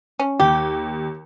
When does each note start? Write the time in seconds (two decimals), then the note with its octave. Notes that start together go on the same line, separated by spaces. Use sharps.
0.19 C#4
0.40 D#2 G4